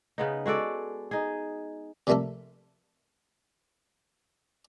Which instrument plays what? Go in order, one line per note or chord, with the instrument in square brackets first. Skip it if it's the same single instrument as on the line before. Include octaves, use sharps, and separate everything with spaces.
[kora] C#3 B3 D#4
G#3 F#4 A4 D5
D#4 G#4
[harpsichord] C3 F3 G3 A3 A#3 A4